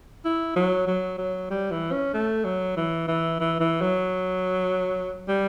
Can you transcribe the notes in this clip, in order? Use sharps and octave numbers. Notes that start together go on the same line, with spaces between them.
E4
F#3
F#3
F#3
G3
E3
C#4
A3
F#3
E3
E3
E3
E3
F#3
G3